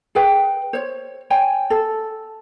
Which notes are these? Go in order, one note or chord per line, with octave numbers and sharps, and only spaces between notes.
G#4 B4 G5
C5 C#5
C#5 G5 G#5
A4